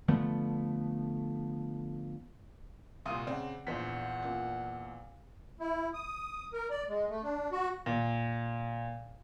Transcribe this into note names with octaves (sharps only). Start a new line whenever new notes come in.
D3 F3 A3 B3
C2 A#2 F5 C6 D#6
C#3 C4 D5 F#5
A#1 E2 C5 F#5 B6
A#2
E4
D#6
A#4
D5
G#3
A3
D4
F#4
A#2